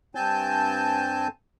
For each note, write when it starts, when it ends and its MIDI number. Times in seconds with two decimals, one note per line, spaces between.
0.15 1.28 43
0.15 1.28 60
0.15 1.28 80
0.15 1.28 81
0.15 1.28 91